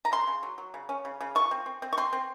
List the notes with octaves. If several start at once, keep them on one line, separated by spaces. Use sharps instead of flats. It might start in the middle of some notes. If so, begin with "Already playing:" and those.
A#5
C#3 C6
C#3
F#3
F#3
C#3
C#4
C#3
C#3
F3 C#6
C4
C4
C4
C#6
C4 C6
C4